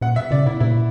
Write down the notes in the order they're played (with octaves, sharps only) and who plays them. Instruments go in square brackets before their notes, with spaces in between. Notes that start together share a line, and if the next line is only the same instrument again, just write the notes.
[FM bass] A#2 [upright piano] F#5
[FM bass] B2 [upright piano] E5
[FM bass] C#3 [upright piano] D5
[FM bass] B2 [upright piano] E4
[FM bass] A#2 [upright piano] E4